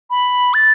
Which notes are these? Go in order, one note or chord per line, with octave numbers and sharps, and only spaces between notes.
B5
A6